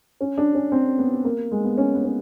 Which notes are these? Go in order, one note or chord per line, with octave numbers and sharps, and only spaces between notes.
C#4
D4
C#4
C4
B3
A#3
G#3
B3
C#4
B3
C#4